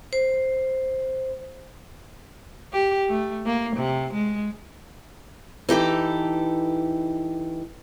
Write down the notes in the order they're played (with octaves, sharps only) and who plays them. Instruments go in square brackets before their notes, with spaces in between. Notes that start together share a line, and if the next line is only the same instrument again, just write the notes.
[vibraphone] C5
[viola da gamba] G4
A3
A#3
C3
G#3
[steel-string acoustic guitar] E3 D#4 G4 A4